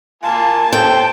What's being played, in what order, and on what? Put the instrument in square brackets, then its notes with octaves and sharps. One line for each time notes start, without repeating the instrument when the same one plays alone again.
[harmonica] A#3 F4 G#5 [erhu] A5
[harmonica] A4 C5 [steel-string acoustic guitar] G5